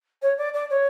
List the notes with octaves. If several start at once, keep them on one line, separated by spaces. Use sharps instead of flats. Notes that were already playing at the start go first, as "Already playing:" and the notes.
C#5
D5
D5
C#5